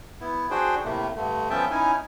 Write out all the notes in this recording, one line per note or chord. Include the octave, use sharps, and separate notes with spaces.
B3 E4
D4 F#4 G#4 C5 G5
A2 C3 A3 A#3
G2 D3 A3
F3 B3 C#4 E5 G5 A5
C#4 D#4 E4 G#5